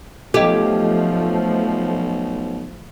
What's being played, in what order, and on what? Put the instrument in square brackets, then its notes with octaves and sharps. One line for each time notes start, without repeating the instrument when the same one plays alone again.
[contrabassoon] B1 [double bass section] F3 A3 [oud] G4 [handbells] A4 D#5